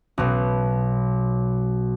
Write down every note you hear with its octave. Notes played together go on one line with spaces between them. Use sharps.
B1 B2